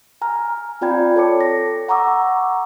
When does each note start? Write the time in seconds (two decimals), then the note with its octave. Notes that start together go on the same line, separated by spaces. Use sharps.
0.22 G#5 A#5 F6
0.81 C4 F4 D5 G5 B5 G#6
1.16 A4 C#5 A5 D6 C#7
1.41 A#6
1.88 F#5 A#5 C#6 D6 E6